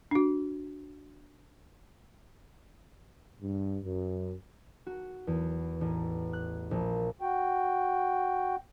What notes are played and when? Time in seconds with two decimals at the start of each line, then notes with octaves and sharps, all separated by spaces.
0.11 D4 F#4
3.42 G2
3.83 F#2
4.86 F#4
5.27 E2
5.81 A1
6.33 F#6
6.71 A#1
7.21 F#4 G5